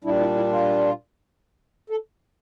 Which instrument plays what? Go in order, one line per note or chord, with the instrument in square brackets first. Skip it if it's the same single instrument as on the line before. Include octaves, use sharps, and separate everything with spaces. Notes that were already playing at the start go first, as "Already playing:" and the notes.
[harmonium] A#2 G3 D4 E4
E4
E4
F4
A4